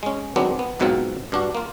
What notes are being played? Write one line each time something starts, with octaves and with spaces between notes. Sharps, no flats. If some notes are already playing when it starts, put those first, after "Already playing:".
G#3 C#4
D#3 F#3 G#3 B3 C4 D4
B3
B1 G#2 B2 F#3 C4 F4
G2 D4 F#4
A#3 F4